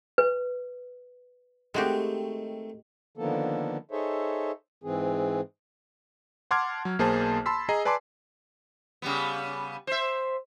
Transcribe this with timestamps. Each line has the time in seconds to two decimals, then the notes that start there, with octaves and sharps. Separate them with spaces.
0.18 B4
1.74 D#3 G#3 A3 C4 F#4 G4
3.17 D3 D#3 F3 A#3 B3 A4
3.91 D#4 G#4 A4 C5 C#5 E5
4.84 G#2 E3 C4 G#4
6.51 F#5 A5 C6 D6 F6 G#6
6.85 F#3
6.99 B1 A#3 G#4 C5 A5
7.46 A5 B5 C6 E6 B6
7.69 G#4 D#5 A#5 C7
7.85 B4 D5 G#5 A5 C6 D6
9.02 C#3 G3 B3
9.87 C5 E5